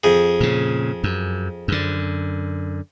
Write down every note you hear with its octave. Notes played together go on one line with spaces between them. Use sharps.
F2 G#4
A#2 C#3
F#2
F#2 D3